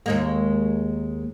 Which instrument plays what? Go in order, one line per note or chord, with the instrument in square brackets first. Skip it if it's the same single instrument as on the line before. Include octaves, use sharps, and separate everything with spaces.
[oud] D#2 G#3 A#3